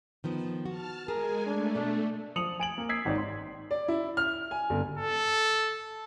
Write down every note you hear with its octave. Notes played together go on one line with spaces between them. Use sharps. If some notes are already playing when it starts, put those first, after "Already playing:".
D#3 F3 B3
F#4 A5 F6
G#3 G#4 A#4 G#5
A3 D4
B2 D4 A4
F3 D#6 C#7 F7 F#7
G#5 D7 F#7
A#3
D#6 E6 G#6 B6 C7
G#1 D#4 C#5 D5
C6
D5
E4
F6
G#5
G1
A4